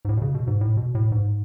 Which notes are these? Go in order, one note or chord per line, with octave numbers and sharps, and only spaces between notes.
G#2
A2
B2
C#3
B2
G#2
A2
B2
A2
G#2